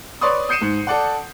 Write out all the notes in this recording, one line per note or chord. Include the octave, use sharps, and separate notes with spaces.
B4 C#5 D5 C6 C#6 D#6
D#6 G6 C7 C#7 D#7 E7
G#2
A4 D5 F#5